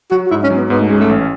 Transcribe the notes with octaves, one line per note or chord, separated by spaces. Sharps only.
F#3 F#4
F#4
G#2 E4
C#4
F#3
B3
G#2 B3
A3
G#3 C#4
A3
A1